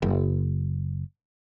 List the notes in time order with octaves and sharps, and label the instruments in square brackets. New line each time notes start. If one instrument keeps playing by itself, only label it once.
[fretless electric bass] F#1